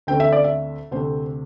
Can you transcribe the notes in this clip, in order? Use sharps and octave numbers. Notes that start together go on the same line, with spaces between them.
D2 D3 A3 C4 G5
E5
D5
E5
D2 C3 A3 C4 C5